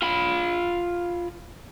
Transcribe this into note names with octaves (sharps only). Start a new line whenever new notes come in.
F4 B5